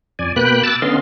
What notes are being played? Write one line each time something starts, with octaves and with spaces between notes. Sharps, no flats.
F2 D5 G#5
B2 A#3 B4 G5 B5 F#6
A5 D6 E6 F#6 A6
D3 B3 C#4 D#5 F5 C6